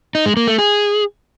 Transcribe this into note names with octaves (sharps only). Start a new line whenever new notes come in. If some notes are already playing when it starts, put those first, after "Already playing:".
D#4
G#3
A#3
A3
G#4